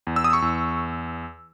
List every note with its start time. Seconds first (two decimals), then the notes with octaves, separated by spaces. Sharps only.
0.07 E2
0.16 E6
0.24 D#6
0.33 C#6 E6
0.42 E2